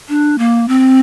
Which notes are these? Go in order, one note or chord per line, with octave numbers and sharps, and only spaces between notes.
D4
A#3
C4